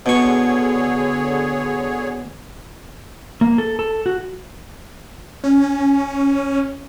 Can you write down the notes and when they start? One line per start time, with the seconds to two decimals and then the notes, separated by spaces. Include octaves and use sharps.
0.06 B2 D3 G#4 C#5 C#6
3.41 A#3
3.58 A4
3.79 A4
4.06 F#4
5.44 C#4